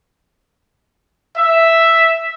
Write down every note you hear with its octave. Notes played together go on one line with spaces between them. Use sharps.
E5